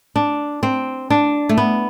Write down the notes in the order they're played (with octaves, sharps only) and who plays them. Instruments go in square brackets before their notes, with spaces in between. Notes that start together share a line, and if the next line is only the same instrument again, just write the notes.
[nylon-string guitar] D4
C4
D4
A3
B3